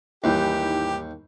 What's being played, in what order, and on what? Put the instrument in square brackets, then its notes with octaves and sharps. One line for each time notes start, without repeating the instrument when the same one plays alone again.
[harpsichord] D#2 [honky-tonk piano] G#2 E3 G3 [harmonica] G4